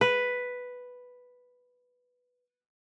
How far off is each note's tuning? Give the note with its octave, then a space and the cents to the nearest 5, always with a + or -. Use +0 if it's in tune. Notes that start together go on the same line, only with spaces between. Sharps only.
B4 +0